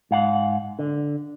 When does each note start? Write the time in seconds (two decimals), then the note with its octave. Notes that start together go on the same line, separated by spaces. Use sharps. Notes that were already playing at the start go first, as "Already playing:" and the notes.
0.11 G#2 F5 F#5
0.79 D3